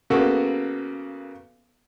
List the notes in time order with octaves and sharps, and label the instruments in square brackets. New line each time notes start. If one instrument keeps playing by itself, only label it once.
[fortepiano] C#3 A#3 B3 F#4 A4